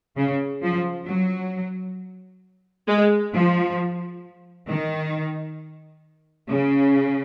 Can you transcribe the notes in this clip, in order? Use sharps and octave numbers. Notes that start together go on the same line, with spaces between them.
C#3
F3
F#3
G#3
F3
D#3
C#3